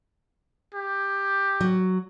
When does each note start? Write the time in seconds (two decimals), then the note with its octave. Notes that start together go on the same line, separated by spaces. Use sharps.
0.74 G4
1.61 F#3